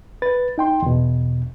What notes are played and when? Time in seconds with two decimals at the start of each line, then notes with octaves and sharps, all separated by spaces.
0.22 B4 A6
0.58 D#4 G5 C6
0.82 E2 B2